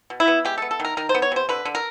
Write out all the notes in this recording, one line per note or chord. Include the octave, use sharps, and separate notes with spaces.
B2
E4
B3
G#3 G4
A4
B3
A4
D#3
A#4
D#3 A#4
C5
B3
C#5
C3 C5
D3 B4
D3
A#4